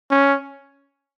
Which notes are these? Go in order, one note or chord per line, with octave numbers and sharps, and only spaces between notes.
C#4